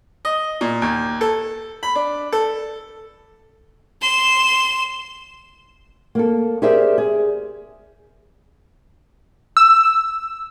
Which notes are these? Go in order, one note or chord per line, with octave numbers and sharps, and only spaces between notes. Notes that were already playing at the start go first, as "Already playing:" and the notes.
D#5
A#2
D#2
A4
B5
D4
A4
C6 E7
A#3 A4
G4 G#4 A#4 C5 D5 E5
G#4
E6